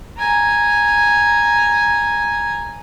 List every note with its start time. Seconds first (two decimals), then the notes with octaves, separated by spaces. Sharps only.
0.18 G#5 A#5